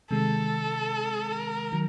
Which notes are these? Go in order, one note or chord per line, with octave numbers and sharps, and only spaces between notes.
C3 D#3 G#3 A4
A#4
D#3 F#3